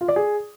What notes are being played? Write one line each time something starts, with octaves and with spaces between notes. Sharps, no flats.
F4
D5
G#4